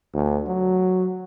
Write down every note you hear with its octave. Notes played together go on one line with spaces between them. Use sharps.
D2
F#3